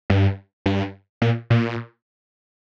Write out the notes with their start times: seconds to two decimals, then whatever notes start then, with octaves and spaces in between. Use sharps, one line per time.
0.10 G2
0.66 G2
1.22 A#2
1.50 A#2